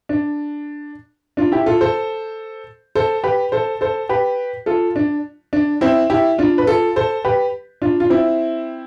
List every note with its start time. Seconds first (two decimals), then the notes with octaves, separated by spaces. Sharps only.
0.09 D4
1.37 D4 F4
1.52 E4 G4
1.66 F4 A4
1.81 A4 C5
2.95 A4 C5
3.24 G4 B4
3.52 A4 C5
3.81 A4 C5
4.09 G4 B4
4.66 F4 A4
4.96 D4
5.53 D4
5.81 C4 E4
6.10 E4 G4
6.38 D4 F4
6.58 B4
6.67 F4 A4
6.96 A4 C5
7.25 G4 B4
7.82 D4 F4
8.00 F4
8.10 C4 E4